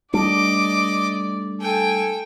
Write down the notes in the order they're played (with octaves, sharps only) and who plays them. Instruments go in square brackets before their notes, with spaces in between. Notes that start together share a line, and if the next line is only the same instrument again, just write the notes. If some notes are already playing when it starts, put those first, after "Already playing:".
[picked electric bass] G3 A3 D4 [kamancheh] D5 [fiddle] D#5 D6
[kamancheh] A4 G#5 [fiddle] G5